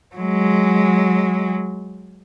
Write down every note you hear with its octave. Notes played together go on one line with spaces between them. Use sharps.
F#3 G#3